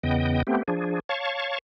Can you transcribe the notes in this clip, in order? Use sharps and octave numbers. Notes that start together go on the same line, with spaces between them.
E2 C#3 B3 D#5 G5
A3 B3 C4 G4
F3 D4 G#4
C#5 F5 A5 C#6